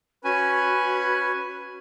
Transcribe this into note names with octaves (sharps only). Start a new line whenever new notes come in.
C#4 F#4 B4 G#5